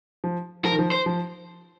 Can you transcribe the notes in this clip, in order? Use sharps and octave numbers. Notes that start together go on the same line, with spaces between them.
F3
F3 A#4
D#3
F3
C5
F3